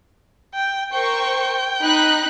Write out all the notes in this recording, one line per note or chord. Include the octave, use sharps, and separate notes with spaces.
G5
A#4 C5 G5 C#6
D#4 B5 F#6